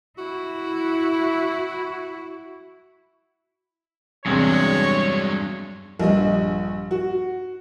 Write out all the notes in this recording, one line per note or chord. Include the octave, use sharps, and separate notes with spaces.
E4 F#4
E2 G2 C3 F#3 G#3 D4 C#5
A#1 G2 D#5
F#4